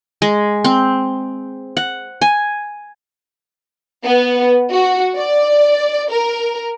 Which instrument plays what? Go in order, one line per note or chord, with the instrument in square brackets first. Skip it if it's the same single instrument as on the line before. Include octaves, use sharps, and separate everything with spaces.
[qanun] G#3
C4
F#5
G#5
[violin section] B3
F#4
D5
A#4